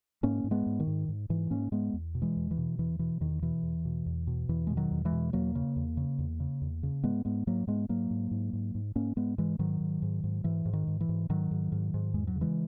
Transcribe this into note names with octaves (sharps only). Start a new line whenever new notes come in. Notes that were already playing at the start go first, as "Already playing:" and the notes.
G#2 A#3 C#4
G#2
G#3 B3
G#2
D#3
G#2
G#2
G#2 E3
G#2 A#3 C#4
G#2 G#3 B3
E2
B2
E3 G#3
E2
E3
B2
E2 E3
B2 E3
E2 D#3
B2 E3
E2
B2
E2
B2
E2 E3
B2 G#3
D#3 F#3
E2
E3 G#3
B2
E2 F#3 A#3
C#3
E2
C#3
E2
C#3
E2
C#3
G#2 G#3 B3
G#2 G#3 B3
G#2 F#3 A#3
G#2 G#3 B3
G#2 F#3 A#3
G#2
G#2
G#2
G#2
G#2 A#3 C#4
G#2 G#3 B3
G#2 E3 G#3
G#2 D#3 F#3
G#2
G#2
G#2
G#2 E3
G#2
D#3
G#2
E3
G#2
G#2 D#3 F#3
G#2
G#2
G#2
E2 G#3
F#3
C#3
E3 G#3